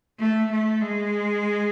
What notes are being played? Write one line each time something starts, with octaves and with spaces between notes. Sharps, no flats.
A3
A3
G#3